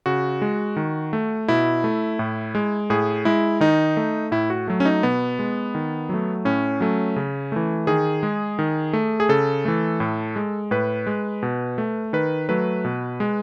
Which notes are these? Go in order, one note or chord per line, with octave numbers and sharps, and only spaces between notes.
C#3 F#4
G#3
D#3
A3
B2 E4
A3
A2
G#3
A2 G#4
G#3 E4
D#3 D#4
A3
A2 E4
F#4
F#3 A3
C#4
D#4
B2 B3
G#3
D#3
F#3 A3
A2 C#4
F#3 A3
C#3
E3 A3
D#3 G#4
G#3
D#3
A3
G#4
C#3 A4
E3 A3
A2
G#3
A2 B4
G#3
B2
A3
D#3 B4
F#3 A3 B4
B2
G#3